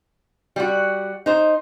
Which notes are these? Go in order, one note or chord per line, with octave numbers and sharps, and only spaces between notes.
G3 F#4
D#4 C5